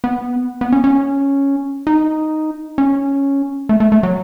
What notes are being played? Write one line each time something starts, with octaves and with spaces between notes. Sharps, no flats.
B3
B3
C#4
C#4
D#4
C#4
A3
A3
A3
F#3